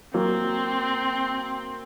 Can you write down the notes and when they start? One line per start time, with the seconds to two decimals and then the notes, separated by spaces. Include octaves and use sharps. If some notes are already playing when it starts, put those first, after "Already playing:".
0.14 F#3 A#3 C4